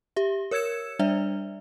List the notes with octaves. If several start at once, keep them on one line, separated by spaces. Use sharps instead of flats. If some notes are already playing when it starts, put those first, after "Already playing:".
G4 E5
A#4 C#5 E6 G#6 C#7 E7
G3 D4 D5 E5